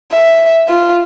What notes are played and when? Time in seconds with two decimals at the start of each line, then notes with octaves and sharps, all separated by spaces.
0.12 E5
0.69 F4